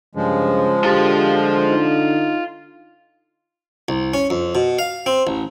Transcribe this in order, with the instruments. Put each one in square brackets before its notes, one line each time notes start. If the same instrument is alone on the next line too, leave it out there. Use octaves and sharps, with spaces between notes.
[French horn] G2 [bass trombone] C#3 [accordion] F3 G#3
[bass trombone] D3 [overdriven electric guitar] F4 A5 [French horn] G4
[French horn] D#4
[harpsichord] C2
C#4
F2
B2
F5
C4
A1